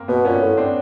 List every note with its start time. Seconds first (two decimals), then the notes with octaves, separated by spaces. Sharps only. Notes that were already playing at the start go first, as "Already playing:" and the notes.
Already playing: A#3 C4
0.08 B2 B3
0.25 A#2 B3 C#4
0.41 A2
0.57 C4 D4